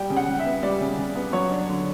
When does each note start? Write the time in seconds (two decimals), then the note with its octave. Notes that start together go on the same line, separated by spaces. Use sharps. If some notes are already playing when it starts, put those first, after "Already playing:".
Already playing: G3 G5
0.10 C#3
0.16 F#5
0.28 C#3
0.39 E5
0.45 B3
0.62 G3 D5
0.80 C#3
0.98 C#3
1.15 B3
1.33 F#3 C#5
1.50 D4
1.68 D3